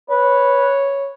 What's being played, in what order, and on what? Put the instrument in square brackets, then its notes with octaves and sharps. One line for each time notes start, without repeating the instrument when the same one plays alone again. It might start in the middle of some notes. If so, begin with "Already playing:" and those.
[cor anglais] B4 [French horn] C#5